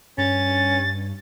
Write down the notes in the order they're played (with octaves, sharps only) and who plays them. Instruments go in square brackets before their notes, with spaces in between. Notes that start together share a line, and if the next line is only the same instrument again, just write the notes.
[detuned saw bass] G2 [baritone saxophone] C#4 [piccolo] A6